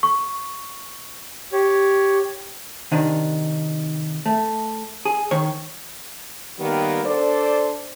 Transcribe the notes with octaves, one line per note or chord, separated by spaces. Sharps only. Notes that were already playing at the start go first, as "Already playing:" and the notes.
C#6
G4 C#5
C3 D#3 D4 D#4
A3
G#4
D#3 C#5
D#3 G3 A#3 B3 A#4
D4 A4 C5 D5